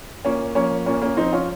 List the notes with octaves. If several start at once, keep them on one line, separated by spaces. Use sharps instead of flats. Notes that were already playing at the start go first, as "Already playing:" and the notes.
A#2 A#3 C#4
F3 A#3 C#4
A#2 A#3 C#4
A#3 C#4
F3 C4 D#4
C#4 F4